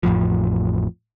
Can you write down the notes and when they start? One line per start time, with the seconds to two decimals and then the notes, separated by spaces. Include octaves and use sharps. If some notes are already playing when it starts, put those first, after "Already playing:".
0.03 A1 F2 A2 F3